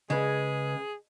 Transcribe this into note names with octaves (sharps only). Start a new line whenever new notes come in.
C#3 G#3 G#4 B4